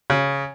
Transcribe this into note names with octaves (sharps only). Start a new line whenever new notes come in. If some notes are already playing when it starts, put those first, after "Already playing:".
C#3